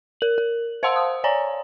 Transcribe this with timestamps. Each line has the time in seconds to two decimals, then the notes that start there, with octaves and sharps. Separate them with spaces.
0.21 A#4 F#7
0.38 A#4
0.83 C5 F5 F#5 A5 C6 E6
0.96 D#6
1.24 C#5 D5 G#5 A#5